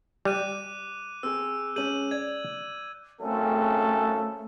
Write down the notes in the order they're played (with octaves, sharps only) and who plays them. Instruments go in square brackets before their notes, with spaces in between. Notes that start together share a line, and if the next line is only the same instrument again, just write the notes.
[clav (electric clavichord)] G3 [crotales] D6 F#6 D#7
[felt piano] C4 G#4 [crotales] E6
[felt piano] G#3 C#4 [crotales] G6 D#7 F#7
[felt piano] D5 [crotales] G#6
[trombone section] G#1 F#2 C#3 [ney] A3 [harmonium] C4 [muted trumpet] A4